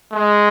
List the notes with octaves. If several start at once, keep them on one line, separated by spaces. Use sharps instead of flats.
G#3